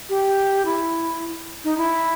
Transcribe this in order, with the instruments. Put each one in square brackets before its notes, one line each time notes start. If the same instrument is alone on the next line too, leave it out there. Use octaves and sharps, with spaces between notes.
[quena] G4
E4
D#4
E4